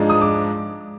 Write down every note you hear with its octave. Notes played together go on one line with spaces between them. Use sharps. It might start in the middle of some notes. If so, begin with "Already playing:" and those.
Already playing: G#2 F3 G#3 D4
D#6
D6